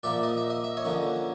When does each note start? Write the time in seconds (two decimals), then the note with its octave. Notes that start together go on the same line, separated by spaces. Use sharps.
0.03 A#2 F3 A#3 D5 E5
0.23 D#5
0.37 E5
0.50 D#5
0.64 E5
0.77 C#5 D#5
0.85 D3 F3 A#3 C#4